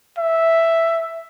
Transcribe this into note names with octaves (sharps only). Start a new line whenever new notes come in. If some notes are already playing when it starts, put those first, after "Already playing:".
E5